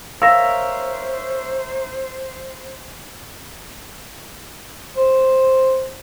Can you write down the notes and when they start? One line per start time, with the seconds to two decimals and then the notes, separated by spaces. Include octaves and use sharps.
0.22 A#4 C5 C#5 E5 F5 E6 A#6
4.96 C5